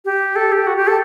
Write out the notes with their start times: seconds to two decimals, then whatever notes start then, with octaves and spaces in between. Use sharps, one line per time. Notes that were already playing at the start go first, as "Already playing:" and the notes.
0.05 G4
0.36 A4
0.52 G4
0.67 F#4
0.76 G4
0.87 A4